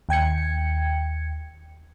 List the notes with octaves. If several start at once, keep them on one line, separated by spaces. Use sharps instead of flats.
D#2 G5 G#6 C#7